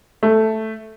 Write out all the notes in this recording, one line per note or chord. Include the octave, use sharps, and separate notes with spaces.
A3